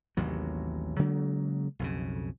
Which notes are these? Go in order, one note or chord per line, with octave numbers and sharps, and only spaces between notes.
A1 D#2 C3 F#3
C#3 F#3 G#3 A#3
B1 F2 C#3